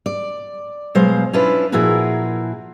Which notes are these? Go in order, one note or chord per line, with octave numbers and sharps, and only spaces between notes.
D5
B2 F#3 G#3 C5 F5
C#4 D4 E4 F4 B4
A#2 F3 E4 F#4 G#4 A#4